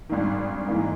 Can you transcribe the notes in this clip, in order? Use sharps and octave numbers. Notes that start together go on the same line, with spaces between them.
G#1 G2 D#3
G#2 E3 A#3 D#4